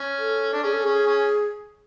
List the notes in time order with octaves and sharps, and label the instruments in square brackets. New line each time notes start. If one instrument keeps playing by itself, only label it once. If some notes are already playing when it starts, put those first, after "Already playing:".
Already playing: [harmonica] C#4
[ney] A4
[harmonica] D4
[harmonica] C#4 [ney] G#4
[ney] A4
[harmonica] C#4 [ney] G#4
[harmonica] C#4